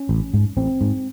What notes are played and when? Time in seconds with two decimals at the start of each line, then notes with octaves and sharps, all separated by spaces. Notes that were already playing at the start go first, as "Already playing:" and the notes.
Already playing: C#4
0.09 A1
0.34 G#2
0.57 A1 C4
0.81 G#2